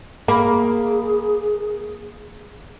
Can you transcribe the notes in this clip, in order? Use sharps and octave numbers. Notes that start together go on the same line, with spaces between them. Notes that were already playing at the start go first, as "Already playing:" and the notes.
A#3 G#4 B5